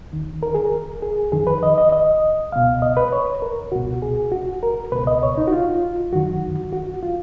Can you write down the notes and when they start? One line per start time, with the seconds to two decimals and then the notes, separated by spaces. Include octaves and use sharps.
0.13 D#2 D#3
0.43 A#4
0.55 G#4
0.65 A#4
1.02 G#4
1.32 F2 D#3 G#4
1.47 B4
1.63 D#5
1.78 D#5
1.92 D#5
2.52 C#2 B2 F5
2.82 D#5
2.97 B4
3.12 C#5
3.42 A#4
3.72 C#2 B2 F#4
4.02 G#4
4.32 F#4
4.63 A#4
4.92 C#2 B2 B4
5.07 D#5
5.23 C#5
5.38 D#4
5.48 F#4
5.53 F4
6.12 F#2 D#3 F#4
6.73 F#4
7.02 F4